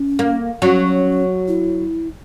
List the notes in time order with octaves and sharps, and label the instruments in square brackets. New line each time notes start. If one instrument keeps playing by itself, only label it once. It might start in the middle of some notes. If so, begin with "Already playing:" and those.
Already playing: [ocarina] C#4
[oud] A#3
[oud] F#3 [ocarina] C#4
[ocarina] E4